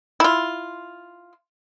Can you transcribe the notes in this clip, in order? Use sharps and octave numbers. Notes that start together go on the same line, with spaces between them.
E4 F4